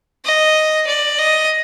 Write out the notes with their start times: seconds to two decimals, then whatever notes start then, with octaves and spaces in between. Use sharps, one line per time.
0.25 D#5
0.87 D5
1.18 D#5